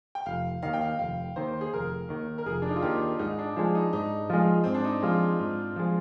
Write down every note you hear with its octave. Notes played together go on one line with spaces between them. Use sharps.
G5
F1 F5
D#2 D#3 F5
G5
F5
F1 F5
D#2 D#3 C5
G#4
F1 A#4
D#2 D#3
A#4
F1 G#4
D4
D#4
F4
D#2 D#3 G4
G#2 D#4
D4
F3 G#3 D4
D#4
G#2 D#4
F3 G#3 F4
G#2 C4
D4
D#4
F3 G#3 F4
G#2
F3 G#3